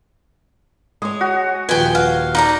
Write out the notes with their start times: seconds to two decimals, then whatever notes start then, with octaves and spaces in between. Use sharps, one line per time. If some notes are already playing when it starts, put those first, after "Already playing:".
1.02 G#3 C#5 D#6
1.21 F#4
1.69 D#1 F3 F4 B4 G5 G#5
1.95 F5 F#5
2.35 D#4 D5 A#5